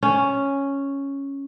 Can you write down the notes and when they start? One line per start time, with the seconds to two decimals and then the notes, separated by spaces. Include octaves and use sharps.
0.03 C#4